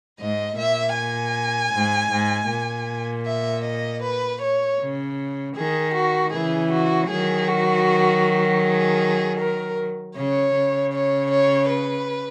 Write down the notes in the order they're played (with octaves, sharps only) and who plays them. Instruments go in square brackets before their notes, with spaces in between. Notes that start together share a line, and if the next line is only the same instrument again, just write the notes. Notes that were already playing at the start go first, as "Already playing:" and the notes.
[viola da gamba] G#2 [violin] D#5
[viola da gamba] A#2 [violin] E5
[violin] G#5
[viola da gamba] G#2
G#2
A#2
[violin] E5
D#5
B4
C#5
[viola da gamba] C#3
[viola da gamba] D#3 [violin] G#4
[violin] F#4
[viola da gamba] C#3 E3 [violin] G#4
[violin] F#4
[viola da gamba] D#3 F#3 [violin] G#4
[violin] F#4
G#4
A#4
[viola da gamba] C#3 [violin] C#5
[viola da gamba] C#3
[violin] C#5
C#5
B4